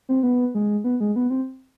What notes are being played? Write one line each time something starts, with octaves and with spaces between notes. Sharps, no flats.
C4
B3
G#3
B3
G#3
B3
C4